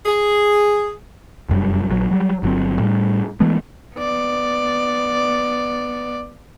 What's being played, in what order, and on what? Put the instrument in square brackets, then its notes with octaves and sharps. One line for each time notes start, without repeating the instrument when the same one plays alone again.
[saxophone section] G#4
[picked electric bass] F1 F#2 G3
A#1 F#3
F#3 G3
G1 F#3 C4
A2 G3
E3 G#3 A3 B3
[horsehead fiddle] B3 D5